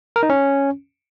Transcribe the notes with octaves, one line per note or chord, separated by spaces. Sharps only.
A#4
D#4
C#4